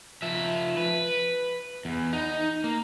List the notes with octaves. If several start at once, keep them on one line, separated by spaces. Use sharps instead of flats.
F3 E5
B4
E2
D#4
A#3